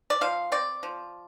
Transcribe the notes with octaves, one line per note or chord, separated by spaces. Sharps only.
D5
F3 F5
C4 D5
F3